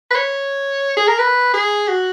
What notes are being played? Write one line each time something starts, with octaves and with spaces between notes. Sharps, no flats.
B4
C#5
G#4
A#4
B4
G#4
F#4